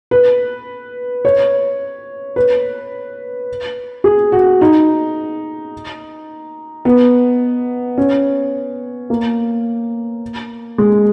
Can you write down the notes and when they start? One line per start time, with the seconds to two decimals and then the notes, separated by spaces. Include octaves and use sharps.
0.11 B4
1.25 C#5
2.36 B4
4.04 G#4
4.32 F#4
4.61 D#4
6.85 B3
7.98 C#4
9.10 A#3
10.78 G#3